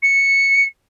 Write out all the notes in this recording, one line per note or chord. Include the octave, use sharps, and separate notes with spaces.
C#7